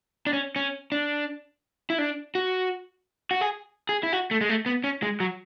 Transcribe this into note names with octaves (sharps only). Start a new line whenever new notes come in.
D4
C#4
C#4
D4
E4
D4
F#4
F#4
G#4
G#4
E4
F#4
A3
G#3
A3
B3
C#4
G#3
F#3